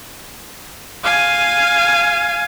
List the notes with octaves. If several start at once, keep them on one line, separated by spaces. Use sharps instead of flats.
F5 G#5